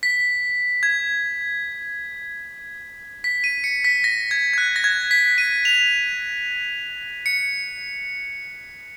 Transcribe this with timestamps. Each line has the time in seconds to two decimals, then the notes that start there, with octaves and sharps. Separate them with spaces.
0.03 B6
0.83 G#6
3.24 B6
3.44 D#7
3.64 C#7
3.84 B6
4.04 A#6
4.31 G#6
4.53 G#6
4.58 F#6
4.76 A#6
4.84 G#6
5.11 B6
5.38 D#7
5.65 F7
7.26 C#7